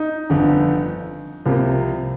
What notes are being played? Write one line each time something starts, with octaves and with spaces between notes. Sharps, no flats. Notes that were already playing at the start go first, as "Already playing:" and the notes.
Already playing: D#4
G1 F2 D3
C2 C3 F3 A#3